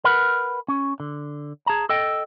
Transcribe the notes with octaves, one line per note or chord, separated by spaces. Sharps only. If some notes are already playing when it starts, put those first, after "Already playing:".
A#4 B4 F#5 B5
C#4
D3
G#4 A5 A#5
A4 D#5 G5